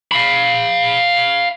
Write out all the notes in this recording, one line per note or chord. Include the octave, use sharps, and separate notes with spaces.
F5 B5